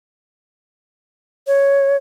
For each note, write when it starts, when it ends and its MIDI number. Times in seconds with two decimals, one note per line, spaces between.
1.47 1.96 73